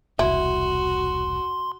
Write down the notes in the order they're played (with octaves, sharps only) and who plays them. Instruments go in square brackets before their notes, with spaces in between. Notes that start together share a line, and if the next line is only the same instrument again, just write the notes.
[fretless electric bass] E1 C2 [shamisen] E4 [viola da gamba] F#4 [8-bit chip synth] C6